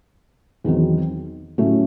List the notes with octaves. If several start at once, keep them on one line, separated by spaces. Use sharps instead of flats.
E2 D#3 F#3 C4
A2 F#3 A3 C#4